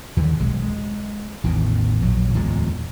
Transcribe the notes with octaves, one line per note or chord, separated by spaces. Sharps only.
D#2 D3 E3
D#1 B1 G#3
G#3
A1 E2 A2 D#3
A#1 F#3
D1 E2 A#2 G#3